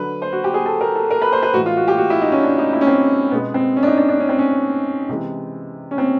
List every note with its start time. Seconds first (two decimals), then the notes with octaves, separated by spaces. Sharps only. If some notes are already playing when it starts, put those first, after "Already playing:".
Already playing: D3 F#3 B4
0.22 C5
0.33 F#4
0.44 G4
0.54 G#4
0.66 A4
0.81 A#4
0.95 A4
1.11 A#4
1.22 B4
1.32 C5
1.43 B4
1.54 A2 E3 G#3 F#4
1.66 F4
1.77 F#4
1.88 G4
1.98 F#4
2.10 E4
2.21 D#4
2.32 C#4
2.43 D4
2.58 D#4
2.73 E4
2.81 C#4
2.87 C4
3.31 B2 G#3 B3
3.54 C4
3.76 C#4
3.83 D4
3.87 D#4
3.97 D4
4.08 D4
4.20 C#4
4.29 C4
4.38 C#4
5.09 C3 E3 G#3
5.91 C#4
5.98 C4